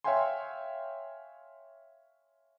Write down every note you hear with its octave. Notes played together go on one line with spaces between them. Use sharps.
C#5 E5 F5 G5 G#5 C6